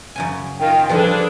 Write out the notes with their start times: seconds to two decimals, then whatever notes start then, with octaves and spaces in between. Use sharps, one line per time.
0.16 F#2 C#3 G#5
0.59 D#3 F4 G5
0.89 F3 G3 D4 F4 G#4 A4 B4